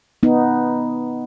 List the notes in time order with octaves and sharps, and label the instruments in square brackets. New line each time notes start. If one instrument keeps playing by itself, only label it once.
[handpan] B3 D#4